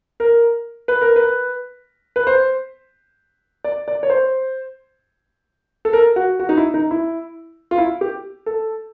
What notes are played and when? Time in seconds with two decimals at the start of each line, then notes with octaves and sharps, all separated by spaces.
0.20 A#4
0.88 B4
1.02 A#4
1.16 B4
2.16 B4
2.27 C5
3.64 D5
3.88 D5
4.03 C#5
4.10 C5
5.85 A4
5.93 A#4
6.16 F#4
6.40 F#4
6.49 D#4
6.57 E4
6.74 D#4
6.91 E4
7.71 F4
7.78 E4
8.01 G4
8.46 A4